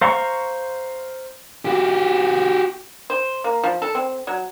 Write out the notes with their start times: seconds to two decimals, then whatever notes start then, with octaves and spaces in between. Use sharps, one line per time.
0.01 C5 F5 A#5 C6 C#6
1.65 F#4 G4
3.10 C5
3.44 A#3
3.64 F3
3.82 A4
3.95 C4
4.27 F#3